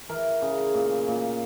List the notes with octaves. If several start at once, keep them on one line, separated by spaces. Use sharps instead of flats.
E3 A#4
C#3
A#2
A#2